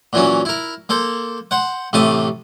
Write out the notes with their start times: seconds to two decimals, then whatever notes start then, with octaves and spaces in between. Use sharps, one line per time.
0.13 A#2 E3 F#3 C#4
0.45 E4 A#4
0.89 A#3 A4 C5
1.51 C5 F#5
1.93 A1 C3 A3 A4 A5 D#6